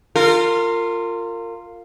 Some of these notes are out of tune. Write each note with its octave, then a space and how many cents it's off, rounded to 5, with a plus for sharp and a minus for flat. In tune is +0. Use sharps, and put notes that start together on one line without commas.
F4 +0 A#4 -30